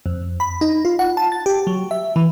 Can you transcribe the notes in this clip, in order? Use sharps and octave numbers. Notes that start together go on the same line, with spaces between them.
F2
B5
D#4
F4
F#5
A5
A6
G4
F#3
E5
E3